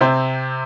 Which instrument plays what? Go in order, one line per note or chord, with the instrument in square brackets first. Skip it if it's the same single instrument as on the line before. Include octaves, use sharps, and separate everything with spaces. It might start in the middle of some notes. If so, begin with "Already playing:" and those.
[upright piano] C3 C4